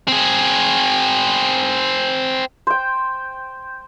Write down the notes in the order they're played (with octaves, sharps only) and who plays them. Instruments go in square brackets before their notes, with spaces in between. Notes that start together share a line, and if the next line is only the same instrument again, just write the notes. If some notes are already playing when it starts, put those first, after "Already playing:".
[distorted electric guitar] C4 G#4
[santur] C5 G5